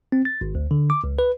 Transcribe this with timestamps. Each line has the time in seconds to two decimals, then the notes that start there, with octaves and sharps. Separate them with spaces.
0.12 C4
0.25 A6
0.41 G#1
0.55 D2
0.71 D3
0.90 D6
1.04 C#2
1.19 B4